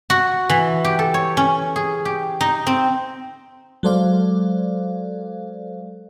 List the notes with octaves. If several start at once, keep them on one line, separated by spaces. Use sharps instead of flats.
F#4
E3
G4
A4
C#5
C#4
G#4
G4
D#4
C4
F#3 G#3 A4 C5 D5 F5